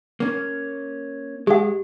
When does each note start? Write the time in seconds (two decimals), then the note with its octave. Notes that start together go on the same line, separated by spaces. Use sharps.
0.20 A#3 C#4
1.47 G#3 G4 F#5